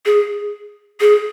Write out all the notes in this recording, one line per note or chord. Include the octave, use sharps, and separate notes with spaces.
G#4
G#4